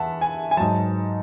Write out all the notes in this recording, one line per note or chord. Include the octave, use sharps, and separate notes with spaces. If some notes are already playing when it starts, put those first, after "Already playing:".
Already playing: E2 E5 F#5 A5
G#5
G#5
G#2 F#3 A5